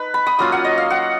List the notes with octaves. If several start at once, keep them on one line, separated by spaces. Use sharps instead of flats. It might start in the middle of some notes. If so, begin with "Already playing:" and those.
Already playing: D#4 B4
B5
D#6
F#3 A#3 C#4 F4 D#6
F#5
D#5
F5
F#5